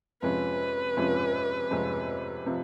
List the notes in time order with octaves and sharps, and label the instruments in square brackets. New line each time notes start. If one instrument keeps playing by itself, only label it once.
[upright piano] F2 C3 F3 G#3 C#4 [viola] B4
[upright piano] F2 C3 F3 G#3 C#4
F2 C3 F3 G#3 C#4
C3 F3